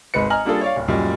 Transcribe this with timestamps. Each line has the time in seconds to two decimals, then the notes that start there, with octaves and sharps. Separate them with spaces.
0.14 G#1 G#3 B4 C#7
0.30 D#5 G#5 A#5 F6 F#7
0.45 G3 A#3 D4 F4 G#4 A4
0.61 C#5 D5 F5
0.76 D1
0.88 F#2 A#2 G3 G#3